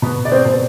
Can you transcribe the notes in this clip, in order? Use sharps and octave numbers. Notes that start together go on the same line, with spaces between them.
B2 B4
D5
C4 C5
B2